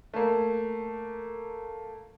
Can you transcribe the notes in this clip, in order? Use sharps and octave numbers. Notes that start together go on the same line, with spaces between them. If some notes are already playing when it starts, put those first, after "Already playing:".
A3 A#3